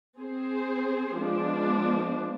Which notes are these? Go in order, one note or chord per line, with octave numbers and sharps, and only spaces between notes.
C4 G#4 C5
F3 G#3 B3 D4